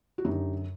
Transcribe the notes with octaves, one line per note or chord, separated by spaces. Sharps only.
F#4
F#2 D3 D#4 G4